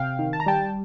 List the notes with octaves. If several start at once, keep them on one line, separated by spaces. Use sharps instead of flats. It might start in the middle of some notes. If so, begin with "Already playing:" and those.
Already playing: C3 F5 G5
D#3
A5
A#5
G3 G5 A5